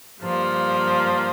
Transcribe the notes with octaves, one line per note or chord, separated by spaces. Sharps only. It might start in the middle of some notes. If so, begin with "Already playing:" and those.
G2 F3 A#3